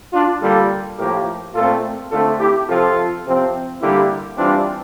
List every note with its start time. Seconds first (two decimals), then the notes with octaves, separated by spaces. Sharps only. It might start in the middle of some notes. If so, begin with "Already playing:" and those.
0.13 D4 F4
0.42 D3 G3 A#3 F4 A4
0.98 A2 F3 A#3 G4 A#4
1.55 A#2 A3 C4 F4 A4
2.12 D3 A3 C4 F4 A4
2.40 E4 G4
2.68 C3 F3 C4 F4 A4
3.25 C3 F3 C4
3.81 D3 G3 A#3 E4 G4
4.38 E3 G3 C4 D4 F4